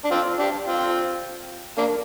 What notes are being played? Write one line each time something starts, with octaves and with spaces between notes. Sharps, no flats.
D4
C4 F4
D4 G4
C4 F4
A#3 D4